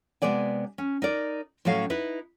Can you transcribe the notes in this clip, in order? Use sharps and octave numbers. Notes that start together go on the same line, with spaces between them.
C3 G#3 B3 D5 G#5
C#4
D#4 A#4 D5
A2 F#3 A3 C#4 F5
D#4 E4 B4